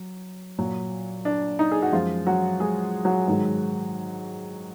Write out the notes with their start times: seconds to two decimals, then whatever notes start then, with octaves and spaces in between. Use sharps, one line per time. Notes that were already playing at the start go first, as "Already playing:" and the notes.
Already playing: F#3
0.58 A#2 F#3
1.25 D4
1.59 D#4
1.72 G#4
1.82 F#4
1.93 F#2 F3 G#3 F4
2.27 F#3 F#4
2.60 G#3 G#4
3.05 F#3 F#4
3.27 G#2 D#3 G#3